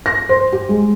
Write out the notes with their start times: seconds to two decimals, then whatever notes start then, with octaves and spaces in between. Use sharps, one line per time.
0.06 A#6
0.29 C5
0.53 G4
0.69 G#3